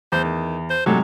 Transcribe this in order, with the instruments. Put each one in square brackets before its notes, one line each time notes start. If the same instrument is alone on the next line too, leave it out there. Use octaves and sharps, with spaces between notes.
[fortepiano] E2 [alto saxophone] C5
[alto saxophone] D#3
C5
[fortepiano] G#2 C3 F#3 [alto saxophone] A4